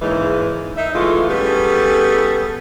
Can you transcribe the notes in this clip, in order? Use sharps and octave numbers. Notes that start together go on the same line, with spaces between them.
G#2 C#3 E3 G#3 A#3
D#4 E5
E3 G#3 A3 F4
G3 B3 C#4 G#4 A4